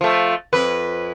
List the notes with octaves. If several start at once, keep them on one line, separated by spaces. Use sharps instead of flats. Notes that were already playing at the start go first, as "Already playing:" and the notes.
F3 A3
F2 B4